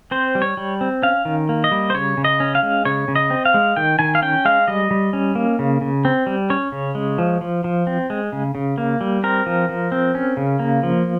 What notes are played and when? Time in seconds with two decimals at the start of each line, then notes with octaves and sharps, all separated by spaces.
0.11 C4 C5
0.35 G3
0.42 C#5
0.57 G3
0.81 C4
1.03 C#4 F5
1.25 D#3
1.49 A#3
1.64 D#5
1.71 G3
1.90 C5
1.94 C#3 C#5
2.17 C#3
2.24 D#5
2.40 C#4
2.55 F5
2.63 G#3
2.85 C#3 C#5
3.08 C#3
3.16 D#5
3.30 C4
3.45 F5
3.54 G#3
3.76 D#3 G5
3.99 D#3 G#5
4.15 F5
4.22 C#4 G5
4.45 G#3 F5
4.68 G3 D#5
4.91 G3
5.13 C#4
5.35 A#3
5.59 C#3
5.81 C#3
6.05 C4
6.27 G3
6.50 C#4 C#5
6.72 C#3
6.95 G#3
7.18 F3
7.41 F3
7.64 F3
7.87 C4
8.10 G#3
8.32 C#3
8.55 C#3
8.78 A#3
9.01 G3
9.23 C4 A#4
9.46 F3
9.69 F3
9.92 C4
10.15 C#4
10.37 C#3
10.59 A#3
10.83 F3